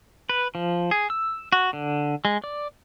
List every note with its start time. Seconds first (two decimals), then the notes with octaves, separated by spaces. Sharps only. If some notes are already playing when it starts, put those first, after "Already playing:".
0.30 B4
0.55 F3
0.91 G#4
1.10 E6
1.53 F#4
1.73 D3
2.25 G#3
2.44 D5